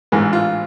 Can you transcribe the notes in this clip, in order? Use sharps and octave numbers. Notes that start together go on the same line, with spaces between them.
A1 G#2 E3
F4